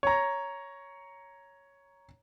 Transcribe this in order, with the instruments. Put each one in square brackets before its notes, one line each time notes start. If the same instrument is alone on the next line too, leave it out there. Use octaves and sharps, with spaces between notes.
[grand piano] C#5 A#5